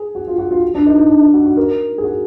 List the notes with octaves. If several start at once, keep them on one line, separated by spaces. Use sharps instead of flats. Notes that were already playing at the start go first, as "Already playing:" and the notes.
Already playing: G#4
F#4
F4
F#4
F4
D4
D#4
D#4
D4
D#4
F#4
F#4
A#4
G#4
F#4